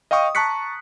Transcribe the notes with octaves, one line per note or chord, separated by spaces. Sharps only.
D#5 F5 G5 C#6 D#6
A5 A#5 C#6 F#6 B6 C#7